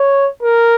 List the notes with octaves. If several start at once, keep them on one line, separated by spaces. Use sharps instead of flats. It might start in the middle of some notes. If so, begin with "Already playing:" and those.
Already playing: C#5
A#4